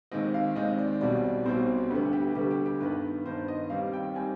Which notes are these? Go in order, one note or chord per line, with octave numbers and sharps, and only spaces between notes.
D#2 D#3 G#3 C4 D#5
F5
D#2 D#3 G#3 C4 D#5
D5
B1 B2 G3 C4 D5
B1 B2 G3 C4 C5
D2 D3 G3 B3 G4
G4
D2 D3 G3 B3 G4
G4
G4
G2 D#3 B3 B4
G2 D#3 B3 C5
D#5
D#2 D#3 G3 C4 F5
G5
D#3 G3 C4 G#5